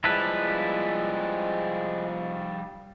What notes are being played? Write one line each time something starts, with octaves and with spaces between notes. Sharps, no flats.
F3 G3 G#3 E4 A4 B4